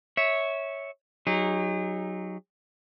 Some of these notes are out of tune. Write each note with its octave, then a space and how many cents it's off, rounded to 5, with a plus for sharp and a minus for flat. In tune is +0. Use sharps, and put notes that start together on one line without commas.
C#5 +0 E5 -15
F#3 +0 D#4 +0 G#4 -40